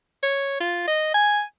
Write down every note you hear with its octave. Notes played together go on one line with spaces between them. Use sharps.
C#5
F4
D#5
G#5